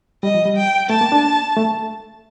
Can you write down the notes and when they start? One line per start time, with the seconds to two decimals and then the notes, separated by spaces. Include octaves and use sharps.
0.23 G3 D#5
0.35 F3
0.45 G3
0.57 G5
0.90 A3 A5
1.01 A#3
1.12 D4
1.57 A3